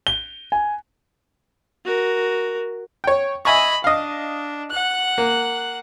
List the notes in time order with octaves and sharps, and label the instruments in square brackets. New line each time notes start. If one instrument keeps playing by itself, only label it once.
[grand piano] G7
G#5
[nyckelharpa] F#4 A#4
[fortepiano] C#5 G5
[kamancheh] D#5 B5 [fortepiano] E5 G#5 C#6
[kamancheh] D4 [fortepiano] D#5 F5
[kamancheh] F#5 F#6
[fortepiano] A#3